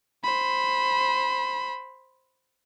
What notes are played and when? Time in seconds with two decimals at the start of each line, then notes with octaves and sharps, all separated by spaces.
0.24 C5 B5